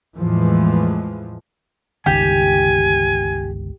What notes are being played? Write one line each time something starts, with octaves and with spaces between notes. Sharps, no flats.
E2 A2 E3 F3 G#3
G1 C#2 D#3 G4 G#5